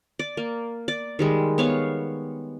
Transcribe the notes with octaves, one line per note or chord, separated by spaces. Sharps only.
D5
A#3
D5
D#3 G3 G#3
B3 C#5 F5